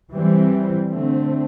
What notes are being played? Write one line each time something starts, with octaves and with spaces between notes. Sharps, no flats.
E3 G3 C4
D3 A3 C4